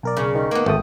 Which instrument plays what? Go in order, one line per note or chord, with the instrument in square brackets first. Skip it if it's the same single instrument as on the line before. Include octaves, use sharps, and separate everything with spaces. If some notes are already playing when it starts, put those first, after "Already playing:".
[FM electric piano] B1 A#4 D5
[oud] C#3
[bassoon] D#3
[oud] A#3 B3
[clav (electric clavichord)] G#1 [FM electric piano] D2 G5 D#6 [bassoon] A3